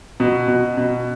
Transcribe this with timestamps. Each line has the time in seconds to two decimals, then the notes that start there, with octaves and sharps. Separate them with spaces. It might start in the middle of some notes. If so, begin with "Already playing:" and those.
0.20 B2
0.48 B2
0.77 B2